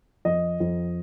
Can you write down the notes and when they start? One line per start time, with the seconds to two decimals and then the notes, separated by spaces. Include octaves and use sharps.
0.25 F2 D#5
0.60 F2